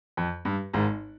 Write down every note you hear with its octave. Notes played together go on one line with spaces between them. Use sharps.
F2
G2
G#1 G#2